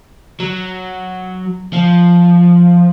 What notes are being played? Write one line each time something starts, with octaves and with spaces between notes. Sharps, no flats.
F#3
F3